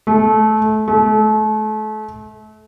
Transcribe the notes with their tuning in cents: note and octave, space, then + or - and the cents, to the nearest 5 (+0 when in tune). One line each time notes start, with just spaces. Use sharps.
A3 -25
A3 -35